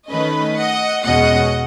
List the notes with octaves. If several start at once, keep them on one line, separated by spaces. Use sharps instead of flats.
D#3 A3 C#4 B4 D#5
D#5 F#5
E2 B2 G#3 C#4 D#5 F#5